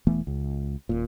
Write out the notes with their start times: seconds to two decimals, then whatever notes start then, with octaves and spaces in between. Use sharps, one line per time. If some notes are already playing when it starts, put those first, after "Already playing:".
0.07 E1 E3 A3 B3
0.27 C#2
0.89 D#1 A#2